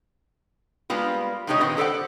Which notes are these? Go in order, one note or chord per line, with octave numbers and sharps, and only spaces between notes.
G3 G#3 A#3 B3 F4
C3 G#3 D#4 G4 C#5 D#5
A#2 D3 D#3 B3 C4
G4 A4 C5 D5 F#5